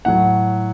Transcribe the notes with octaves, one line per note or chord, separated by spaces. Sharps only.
A2 F#3 F#5